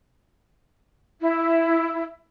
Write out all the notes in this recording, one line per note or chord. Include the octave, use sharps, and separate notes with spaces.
E4